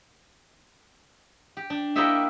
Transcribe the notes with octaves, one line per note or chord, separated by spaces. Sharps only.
G4
D4
A#3 E4 G4 C#5 D#5 E5